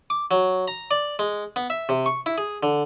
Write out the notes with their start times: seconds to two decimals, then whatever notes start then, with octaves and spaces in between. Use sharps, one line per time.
0.10 D6
0.31 F#3
0.68 A#5
0.91 D5
1.19 G#3
1.56 B3
1.70 E5
1.89 C3
2.06 C#6
2.26 E4
2.38 G#4
2.63 D3